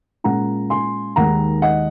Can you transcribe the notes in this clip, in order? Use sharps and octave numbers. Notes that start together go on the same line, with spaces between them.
A#2 G#3 C#4 F4 F#5 A#5
G#5 C6
D#2 D#3 G#3 F#5 A#5
D#5 F#5